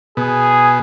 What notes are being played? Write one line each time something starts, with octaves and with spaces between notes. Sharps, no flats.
B2 G#4